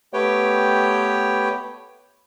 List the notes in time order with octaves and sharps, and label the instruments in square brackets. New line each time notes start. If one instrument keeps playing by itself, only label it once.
[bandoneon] A3 B3 G4 B4 C#5 G5